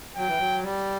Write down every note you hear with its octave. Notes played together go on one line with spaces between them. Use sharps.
F#3 G5
E3
F#3
G3